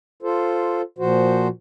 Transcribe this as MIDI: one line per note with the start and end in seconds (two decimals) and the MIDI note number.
0.23 0.82 65
0.23 0.82 69
0.23 0.82 72
0.99 1.48 46
0.99 1.48 53
0.99 1.48 66
0.99 1.48 72